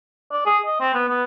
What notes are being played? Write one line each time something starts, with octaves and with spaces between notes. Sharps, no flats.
D5
G#4
D#5
C4
B3
B3